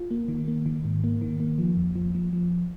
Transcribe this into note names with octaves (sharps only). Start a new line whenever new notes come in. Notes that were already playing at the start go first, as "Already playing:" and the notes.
Already playing: F4
A#3
D#3
A#3
D#3
G#2
A#3
D#3
A#3
F3
F2
F3
F3
F3